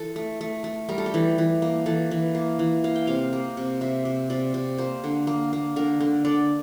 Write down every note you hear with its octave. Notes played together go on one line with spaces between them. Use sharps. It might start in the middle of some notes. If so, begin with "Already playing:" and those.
Already playing: E3 A4
A3
A3
A3
G3 A#4
A4
G4
E3 A4
E3
A#3
E3 A4
E3
A#3
E3
A#3 F5
G5
C3 F5
A#3
C3
C3 E5
C3
C3 D5
C3
A#3 C5
D3
A#3
A#3
D3 A#4
D3
D3 D5